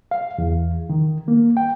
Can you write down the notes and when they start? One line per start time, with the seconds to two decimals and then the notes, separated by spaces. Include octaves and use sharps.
0.11 F5
0.38 E2
0.89 D#3
1.28 A#3
1.57 G5